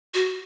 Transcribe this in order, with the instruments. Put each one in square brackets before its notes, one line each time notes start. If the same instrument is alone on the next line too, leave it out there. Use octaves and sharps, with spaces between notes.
[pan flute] F#4